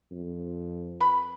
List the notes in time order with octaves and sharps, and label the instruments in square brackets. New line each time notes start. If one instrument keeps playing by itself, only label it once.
[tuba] F2
[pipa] B4 B5